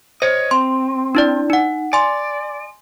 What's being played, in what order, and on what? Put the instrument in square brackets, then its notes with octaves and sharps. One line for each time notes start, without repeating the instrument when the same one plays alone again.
[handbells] C5 [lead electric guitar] C#5 D#5
[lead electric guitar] C4 [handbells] C6
[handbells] D4 E4 D5
D#4 F#5
[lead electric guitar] D5 [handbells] G#5 C6